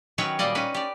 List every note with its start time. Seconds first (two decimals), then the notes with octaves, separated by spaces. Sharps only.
0.18 D#3 F#3 C#4 B4 C#5 G5
0.39 A#2 G3 A#3 D5 D#5
0.55 C#4 D#4 B4
0.74 G4 D5